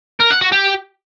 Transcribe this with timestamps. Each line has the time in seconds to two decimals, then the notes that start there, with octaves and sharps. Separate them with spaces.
0.20 A#4
0.31 F#5
0.41 F#4
0.52 G4